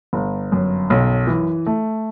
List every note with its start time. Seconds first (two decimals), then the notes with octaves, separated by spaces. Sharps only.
0.13 G1
0.52 F#2
0.90 B1
1.27 E3
1.66 A3